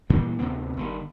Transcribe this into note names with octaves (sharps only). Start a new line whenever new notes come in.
G2 A#2 E3 G3
D2 C3 B3 C4
G1 D#3 G3